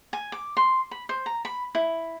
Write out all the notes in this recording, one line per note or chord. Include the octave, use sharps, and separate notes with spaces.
G#5
D6
C6
B5
C5
A#5
B5
E4